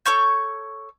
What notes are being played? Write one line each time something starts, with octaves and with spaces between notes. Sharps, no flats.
A4 C#5 C#6 G6